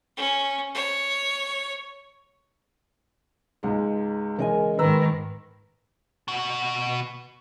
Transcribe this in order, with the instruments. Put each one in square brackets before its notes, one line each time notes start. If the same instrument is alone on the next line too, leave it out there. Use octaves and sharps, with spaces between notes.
[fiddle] C#4
C#5
[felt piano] C#2 G#2 G#3
[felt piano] C#3 E3 G#3 [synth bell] A#4 D#5 G#5
[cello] G#2 D#3 [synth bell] B4 A#5 B5 [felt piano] E6
[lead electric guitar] B2 F#4